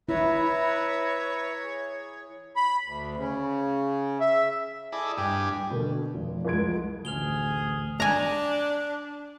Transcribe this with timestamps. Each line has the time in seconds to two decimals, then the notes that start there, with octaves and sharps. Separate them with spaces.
0.09 E4 B4 C#5 E5 A#5
1.63 G#4
2.56 B5
2.86 D2
3.16 C#3
4.20 E5
4.92 E4 G#4 A4 D5 D#5
5.18 G2 G4 G#5
5.70 B2 D3 A#3
6.15 F1
6.45 C2 F2 G#3 G#6 D7
7.05 A1 D2 G#4 F6 F7 G7
8.00 D4 G#5 A#5